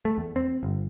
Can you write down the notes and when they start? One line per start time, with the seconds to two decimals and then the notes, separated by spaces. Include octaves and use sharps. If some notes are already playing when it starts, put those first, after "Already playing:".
0.05 A3
0.18 E2
0.36 C4
0.63 G1